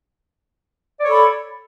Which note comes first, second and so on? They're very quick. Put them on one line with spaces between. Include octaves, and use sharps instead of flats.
D5 C#5 A4 B5